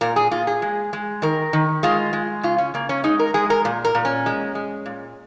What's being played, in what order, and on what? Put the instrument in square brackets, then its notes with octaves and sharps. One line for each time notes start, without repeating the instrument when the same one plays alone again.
[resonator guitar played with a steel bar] A#2 A#4
G#4
A#2 F4
G#4
G#3
G#3
D#3 A#4
D#3
G#3 F4
G#3
C#3 F4
C#4
C#3 A#3
C#4
G#3 D#4
A#4
G#3 G#4
A#4
A#2
A#4
A#2
C#4
G#3
G#3
A#2